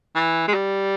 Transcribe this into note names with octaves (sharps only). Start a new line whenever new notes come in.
E3
G#3
G3